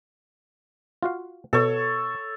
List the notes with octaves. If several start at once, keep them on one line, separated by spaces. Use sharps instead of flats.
F4 F#4 F5
B2 A4 C#5